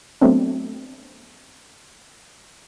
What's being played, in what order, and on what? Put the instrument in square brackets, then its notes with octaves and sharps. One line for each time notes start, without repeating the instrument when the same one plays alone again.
[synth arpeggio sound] F#3 A3 B3 C4 D4